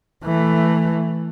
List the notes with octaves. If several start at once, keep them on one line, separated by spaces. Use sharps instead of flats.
E3 A3